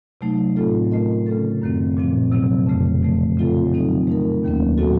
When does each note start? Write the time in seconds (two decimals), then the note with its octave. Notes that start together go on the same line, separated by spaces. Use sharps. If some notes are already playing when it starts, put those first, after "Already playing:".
0.21 C3 F#3 A3 D#4
0.56 A2 A3 C4 F4 A4
0.91 A3 C#4 F4 A#4 D#5
1.27 C#3 A3 C#4 A4
1.62 F#2 D#3 A3 C4
1.97 A#2 F3 C4
2.32 C3 F#3 C4
2.67 F2 C#3 A3
3.02 C3 F3 A3
3.37 C#3 A3 C4 F4 A4
3.73 D#3 F#3 C4 D#4 A4
4.07 A3 D#4 A#4
4.43 D#2 D#3 F#3 A#3 C#4
4.78 A#2 F#3 C4 F#4 A4